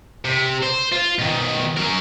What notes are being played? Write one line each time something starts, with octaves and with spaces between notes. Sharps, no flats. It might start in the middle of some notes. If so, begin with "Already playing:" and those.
C3
C5
F4
B2 D#3
F#3 A#4